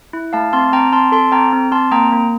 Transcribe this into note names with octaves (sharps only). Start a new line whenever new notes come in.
E4
A3 F5 A5
C4 A5 C6
C4 G5 A#5
C4 A5 C6
A4 A5 C6
C4 G5 A#5
C4
C4 A5 C6
A#3 G5 A#5
A#3